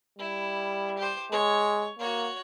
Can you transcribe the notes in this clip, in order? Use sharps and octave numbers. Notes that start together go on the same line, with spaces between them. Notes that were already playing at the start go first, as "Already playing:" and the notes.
G3 E4
G4 C5
G#3 C#5
A#3 F#4 C#5